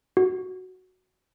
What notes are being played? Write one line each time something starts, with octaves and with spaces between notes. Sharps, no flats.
F#4